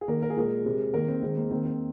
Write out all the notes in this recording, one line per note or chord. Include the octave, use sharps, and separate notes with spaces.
G#4
D#3 A#3 A#4
A#4
G#4
A#2 G#3 A#4
C3 G#3
D#3 A#3 A#4
C4
D#3 G#3 C4
A#3
D#3 A#3 C4
C4